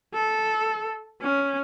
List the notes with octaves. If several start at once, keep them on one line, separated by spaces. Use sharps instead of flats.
A4
C#4